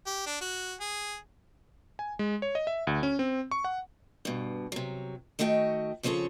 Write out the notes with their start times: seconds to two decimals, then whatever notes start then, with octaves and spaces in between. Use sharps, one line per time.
0.06 G4
0.26 D4
0.41 F#4
0.81 G#4
1.99 G#5
2.19 G#3
2.42 C#5
2.55 D#5
2.67 E5
2.87 D2
3.03 C#4
3.19 C4
3.51 C#6
3.64 F#5
4.25 G2 B2
4.72 C3 F#3
5.39 D#3 A3 F#4 D#5 F#5 G5
6.03 C#3 F3 C4 G#4 A4 C#5